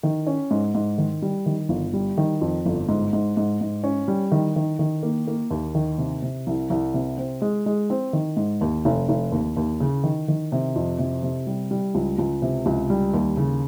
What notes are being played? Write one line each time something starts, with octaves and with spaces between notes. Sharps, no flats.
D#3
C#4
G#2
G#2
D#3
G3
D#3
G1
G3
D#3
F2
G1
G#2
G#2
G#2
G#2
C#4
G3
D#3
D#3
D#3
A#3
A#3
D#2
D#3
C3
C3
C2
C2
C3
C4
G#3
G#3
C4
D#3
G#2
D#2
F1
F1
D#2
D#2
C#3
D#3
D#3
C3
F2
C3
C3
G3
G3
C#2
C#2
C3
C#2
G3
D#2
C#3